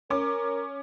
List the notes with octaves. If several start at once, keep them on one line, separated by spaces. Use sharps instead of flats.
C#4 A#4 D6